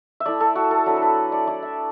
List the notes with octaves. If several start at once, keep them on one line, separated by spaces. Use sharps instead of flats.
E5
A3 E4 D5
A4
F#4
A4
F#3 A3 D4 B4
A4
B4
D5
A3 E4 D5
E5